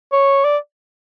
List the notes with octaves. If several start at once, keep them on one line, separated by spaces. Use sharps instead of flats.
C#5
D5